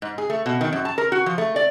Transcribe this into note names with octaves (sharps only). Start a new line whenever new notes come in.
G#2
G#4
A3
B2
D#3
F#2
A5
A#4
F#4
F3
A3
D5